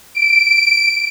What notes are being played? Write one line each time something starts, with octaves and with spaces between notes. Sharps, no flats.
D7